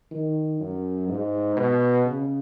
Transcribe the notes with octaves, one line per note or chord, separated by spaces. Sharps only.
D#3
F#2
G#2
B2
C#3